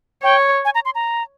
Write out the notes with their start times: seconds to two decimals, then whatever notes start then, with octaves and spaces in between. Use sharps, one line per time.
0.23 C#5 G5
0.65 G#5
0.75 A#5
0.85 C6
0.95 A#5